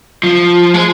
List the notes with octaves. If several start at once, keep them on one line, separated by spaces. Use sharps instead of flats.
F3
G#3